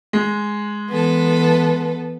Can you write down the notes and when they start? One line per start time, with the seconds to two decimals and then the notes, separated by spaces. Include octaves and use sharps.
0.13 G#3
0.87 E3 B3 A4